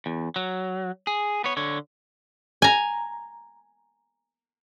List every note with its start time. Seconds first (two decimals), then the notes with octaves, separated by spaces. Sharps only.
0.06 E2
0.36 F#3
1.07 G#4
1.44 B3 C#5
1.57 D3 C#5
2.62 G#5 A#5